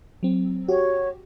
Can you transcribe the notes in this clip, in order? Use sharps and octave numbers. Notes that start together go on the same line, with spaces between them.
F#3 C4
F#4 G4 C#5